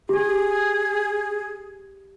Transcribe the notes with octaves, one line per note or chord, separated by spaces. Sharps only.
G4 G#4